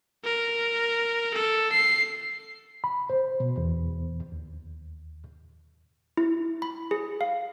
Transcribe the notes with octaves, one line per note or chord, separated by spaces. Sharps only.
A#4
A4
C7
B5
C5
B2
E2
D#2
E4
B5
G#4
F5